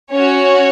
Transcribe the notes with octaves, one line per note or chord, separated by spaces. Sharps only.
C#4 F#4 C#5